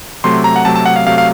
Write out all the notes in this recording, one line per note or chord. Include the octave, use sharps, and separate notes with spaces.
C3 F#3 A3 C6
A#5
F#5
C3 F#3 A3 A5
A5
F#5
F5
C3 F#3 A3 F5
F5